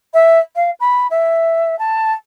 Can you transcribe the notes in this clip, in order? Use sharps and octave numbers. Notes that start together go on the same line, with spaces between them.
E5
F5
B5
E5
A5